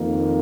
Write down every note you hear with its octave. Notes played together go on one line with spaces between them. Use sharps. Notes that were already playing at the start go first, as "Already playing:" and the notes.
Already playing: F2 D#3 A#3